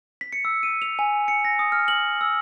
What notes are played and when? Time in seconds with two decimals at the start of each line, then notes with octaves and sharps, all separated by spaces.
0.21 B6
0.32 C#7
0.45 E6
0.63 D#7
0.82 F7
0.99 G#5
1.28 C#7
1.45 A#6
1.59 D#6
1.72 F6
1.88 F#7
2.21 E6